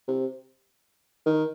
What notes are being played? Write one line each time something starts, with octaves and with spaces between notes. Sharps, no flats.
C3
D#3